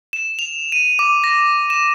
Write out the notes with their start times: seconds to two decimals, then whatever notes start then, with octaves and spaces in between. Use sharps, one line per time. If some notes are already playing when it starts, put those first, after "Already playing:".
0.13 E7
0.39 F7
0.72 D#7
0.99 D6
1.24 A#6
1.70 E7